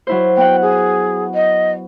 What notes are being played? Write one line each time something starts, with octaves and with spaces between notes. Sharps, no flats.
F#3 E4 C5
B3 F#5 G5
G#4
D#5